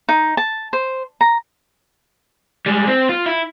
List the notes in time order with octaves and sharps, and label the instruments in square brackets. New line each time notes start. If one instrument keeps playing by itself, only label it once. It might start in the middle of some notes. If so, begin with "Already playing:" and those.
[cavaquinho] D#4
A5
C5
A#5
[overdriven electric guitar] G3 G#3
C4
F4
E4